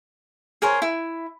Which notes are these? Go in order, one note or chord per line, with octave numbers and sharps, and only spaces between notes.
G#4 A#4 C5 C#5
E4